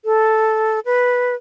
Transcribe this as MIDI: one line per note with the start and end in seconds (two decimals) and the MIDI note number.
0.05 0.79 69
0.85 1.35 71